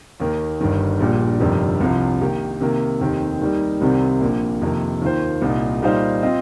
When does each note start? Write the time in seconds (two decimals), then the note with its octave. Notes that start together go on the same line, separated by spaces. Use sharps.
0.20 D#2 D#3 A#3
0.61 G1 G2 D#3
1.00 A#1 A#2 G3
1.40 G1 F2 C3 D#3 G3
1.81 C2 C3 F3
2.21 D#3 A#3 G4
2.60 C3 D#3 A#3
3.00 F1 D#2 D#3 C4 G4
3.42 D#2 D#3 G3 D#4
3.81 C2 C3 D#3 G3 C4
4.21 A#1 A#2 A#3
4.61 F2 C3 D#3 A#3
5.01 D#2 D#3 A#3 F4 C5
5.42 C2 A#2 A#3 D#4
5.82 A#2 G3 D#4 C5 F5
6.23 C4 F4 D#5